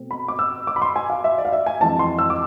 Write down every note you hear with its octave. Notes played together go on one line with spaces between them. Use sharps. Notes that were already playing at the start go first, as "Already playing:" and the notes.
Already playing: B2 A3 C4
B5
D6
E6
D6
B5
C6
G#5
F5
E5
D5
F5
E5
G#5
F2 E3 G#3 C4 A5
C6
E6
D6